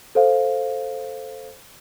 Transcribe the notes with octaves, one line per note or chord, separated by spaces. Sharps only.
A4 C5 F5